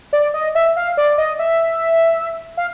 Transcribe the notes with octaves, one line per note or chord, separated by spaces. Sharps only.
D5
D#5
E5
F5
D5
D#5
E5
F5